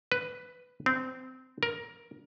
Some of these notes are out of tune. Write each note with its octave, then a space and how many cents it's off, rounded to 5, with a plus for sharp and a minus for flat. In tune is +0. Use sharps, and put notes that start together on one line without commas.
B4 +5
C4 -20
A#4 +15